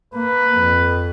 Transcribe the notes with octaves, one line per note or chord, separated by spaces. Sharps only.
A#3 B4
F2